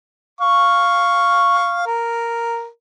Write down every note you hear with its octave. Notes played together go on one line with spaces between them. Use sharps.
F5 C#6
A#4